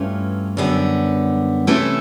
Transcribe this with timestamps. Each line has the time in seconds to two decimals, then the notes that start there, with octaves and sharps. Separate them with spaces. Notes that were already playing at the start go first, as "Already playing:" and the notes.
Already playing: G2 E3 A3 C#4 F4
0.57 F#2 D3 G3 B3
1.67 C3 E3 A3 C#4 E4